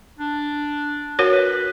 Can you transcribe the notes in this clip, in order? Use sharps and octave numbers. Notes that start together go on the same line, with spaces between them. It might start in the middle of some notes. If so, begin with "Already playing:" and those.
D4
F#4 A#4 C#5
B4